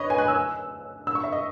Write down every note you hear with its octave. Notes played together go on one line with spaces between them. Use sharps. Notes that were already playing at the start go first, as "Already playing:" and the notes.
Already playing: B4 C#5 D#5
G#5
F#6
E6
E6
C#6
E5
D#5